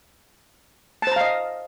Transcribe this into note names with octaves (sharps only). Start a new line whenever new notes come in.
C5 D#5 F5 A5 A#5